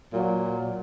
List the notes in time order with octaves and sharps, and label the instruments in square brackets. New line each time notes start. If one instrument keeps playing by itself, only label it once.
[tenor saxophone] A#2 [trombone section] F#3